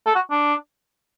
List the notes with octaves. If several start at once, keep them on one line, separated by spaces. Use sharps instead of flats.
A4
F#4
D4